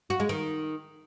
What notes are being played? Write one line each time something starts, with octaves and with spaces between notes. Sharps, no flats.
F#4
G#3
D#3